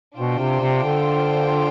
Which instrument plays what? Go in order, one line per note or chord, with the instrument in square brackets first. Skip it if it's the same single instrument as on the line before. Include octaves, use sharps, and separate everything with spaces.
[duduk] B2 [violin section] D4 F4 C5 G5
[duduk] C3
C3
D3